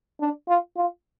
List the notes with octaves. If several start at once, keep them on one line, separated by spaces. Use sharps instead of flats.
D4
F4
F4